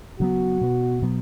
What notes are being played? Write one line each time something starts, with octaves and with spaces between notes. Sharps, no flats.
C#3 F#3 B3 F#4
B2 B3
B2 F#3 B3